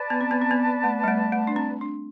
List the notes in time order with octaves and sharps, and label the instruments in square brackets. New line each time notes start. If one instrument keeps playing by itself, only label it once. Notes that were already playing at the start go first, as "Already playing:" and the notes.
Already playing: [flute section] B4 D5 A5
[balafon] B3
C4
B3
C4
B3
A3
G3
A3
A3
D4
C4
D4